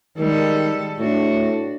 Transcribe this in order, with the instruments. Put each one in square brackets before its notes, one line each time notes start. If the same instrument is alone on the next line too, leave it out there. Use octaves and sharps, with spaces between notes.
[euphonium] D#3 [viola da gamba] G3 G#3 A4
[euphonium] A2 [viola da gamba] D4 F#4